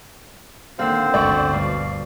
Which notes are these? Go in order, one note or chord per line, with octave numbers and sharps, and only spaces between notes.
D#2 D3 A#3 C4 C5 D5 E5 F5
G1 D2 C#3 G#3 A3 D5 C#6
G2 B2 F5